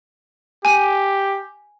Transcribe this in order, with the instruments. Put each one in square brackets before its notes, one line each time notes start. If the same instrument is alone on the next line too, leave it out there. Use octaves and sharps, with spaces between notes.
[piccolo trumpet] G4 [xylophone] G#5 D#7